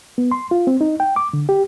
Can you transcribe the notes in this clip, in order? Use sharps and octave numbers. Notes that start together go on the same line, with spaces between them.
B3
C6
F4
C4
D#4
G5
D6
D3
G4